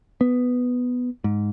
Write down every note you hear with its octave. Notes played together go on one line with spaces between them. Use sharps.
B3
G#2